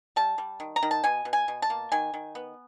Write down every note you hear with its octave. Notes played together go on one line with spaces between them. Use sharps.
G3 A5
G3
D#3
A#5
D#3
A5
B2 G#5
B2
G#5
B2
A5
A#3
D#3 G#5
D#3
B3